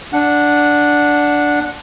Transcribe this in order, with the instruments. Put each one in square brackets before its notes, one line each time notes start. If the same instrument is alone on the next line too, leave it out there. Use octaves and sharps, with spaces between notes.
[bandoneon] D4 F#5